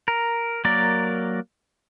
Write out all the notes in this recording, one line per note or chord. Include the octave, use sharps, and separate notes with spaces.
A#4
F#3 A#3 A#4 D5